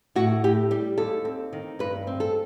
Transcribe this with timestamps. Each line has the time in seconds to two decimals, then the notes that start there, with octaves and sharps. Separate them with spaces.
0.15 A2 F#4
0.44 A2 G4
0.71 G3 G4
0.98 D#2 A4
1.25 C4
1.53 D#3
1.79 G2 B4
2.07 C4
2.20 A4